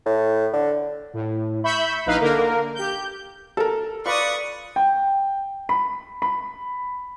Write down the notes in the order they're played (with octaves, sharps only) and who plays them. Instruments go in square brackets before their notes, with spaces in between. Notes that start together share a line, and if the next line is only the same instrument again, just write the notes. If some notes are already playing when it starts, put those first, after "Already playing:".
[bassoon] A2
D3
[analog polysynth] A2
E5 B5 C#6 G6
A#1 D#4 E4 B4 D#5 F5
D3 A#3 A#4
G4 G6
[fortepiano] A4 [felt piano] A#4 A5
[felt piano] F4 [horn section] B4 D5 [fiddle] C#6 D#6
[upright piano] G5
B5
B5